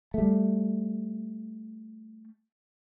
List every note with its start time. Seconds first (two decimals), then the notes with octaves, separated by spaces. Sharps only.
0.14 G3 A3